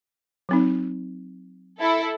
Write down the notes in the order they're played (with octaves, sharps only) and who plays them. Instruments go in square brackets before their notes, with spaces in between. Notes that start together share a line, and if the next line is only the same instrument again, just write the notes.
[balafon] F#3 C4 D#4
[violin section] E4 A4